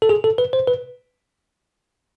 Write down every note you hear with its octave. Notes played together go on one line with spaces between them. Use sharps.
A4
G#4
A4
B4
C5
B4